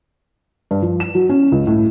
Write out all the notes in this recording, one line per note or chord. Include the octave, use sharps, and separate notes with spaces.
G2
F3
E7
F#3
C#4
C#2
A2